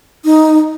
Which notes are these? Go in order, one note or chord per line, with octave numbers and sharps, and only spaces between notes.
D#4